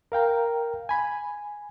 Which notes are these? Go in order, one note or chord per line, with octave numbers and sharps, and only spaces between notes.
A#4 F5 G5 A#5
G#5 B5